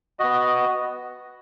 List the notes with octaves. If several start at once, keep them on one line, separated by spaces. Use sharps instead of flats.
B3 F#4 D#5